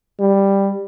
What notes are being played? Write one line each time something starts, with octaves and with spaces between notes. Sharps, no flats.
G3